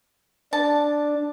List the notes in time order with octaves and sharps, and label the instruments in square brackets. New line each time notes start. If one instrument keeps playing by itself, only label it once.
[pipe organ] D4 [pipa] A5